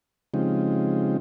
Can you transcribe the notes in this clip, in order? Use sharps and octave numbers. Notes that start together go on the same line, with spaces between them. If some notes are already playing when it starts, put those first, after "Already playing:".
C#3 F3 G#3 C4 D#4 G4